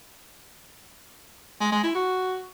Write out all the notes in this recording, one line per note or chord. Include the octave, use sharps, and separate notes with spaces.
G#3
G#3
E4
F#4